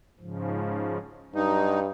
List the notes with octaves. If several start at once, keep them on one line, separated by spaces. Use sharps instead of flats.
G#2 C#3 F3
G2 F#3 D#4